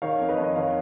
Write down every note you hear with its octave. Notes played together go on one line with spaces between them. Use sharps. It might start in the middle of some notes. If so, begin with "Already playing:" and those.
D#3 C#5 F5
F2
B4 D#5
F2
D#5
D#3 C#5 F5